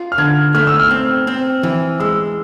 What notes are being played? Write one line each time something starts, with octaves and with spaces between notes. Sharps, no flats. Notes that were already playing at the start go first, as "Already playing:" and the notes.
Already playing: F4
F6
D3 G#6
A3 F6
E6
F6
C4
C4
E3
G#3 E6